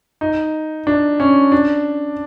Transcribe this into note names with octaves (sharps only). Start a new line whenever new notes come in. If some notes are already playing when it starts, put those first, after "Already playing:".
D#4
D4
C#4
D4